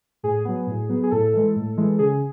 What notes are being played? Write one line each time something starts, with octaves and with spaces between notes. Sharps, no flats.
A2 G#4
F#3 B3
A2
F#3 B3
G#4
A2 A4
E3 G#3
A2
E3 G#3
C#3 G#4